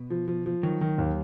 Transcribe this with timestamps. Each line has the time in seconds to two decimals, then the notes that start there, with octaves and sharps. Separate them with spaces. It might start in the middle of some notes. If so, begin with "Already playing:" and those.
Already playing: B2
0.10 F3
0.28 F3
0.46 F3
0.63 D#3 F#3
0.81 D#3
0.98 D#2